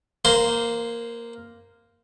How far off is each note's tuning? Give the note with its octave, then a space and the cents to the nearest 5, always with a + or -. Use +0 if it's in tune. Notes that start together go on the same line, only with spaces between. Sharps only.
A#3 +0 C5 -20 C6 +0